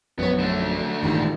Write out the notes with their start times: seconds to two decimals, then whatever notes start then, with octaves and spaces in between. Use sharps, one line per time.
0.19 A#1 F#2 F#3 B3 C#5
0.39 D3 A3
1.03 A1 G2 A#2 D#3 G3